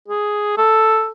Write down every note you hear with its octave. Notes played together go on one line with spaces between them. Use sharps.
G#4
A4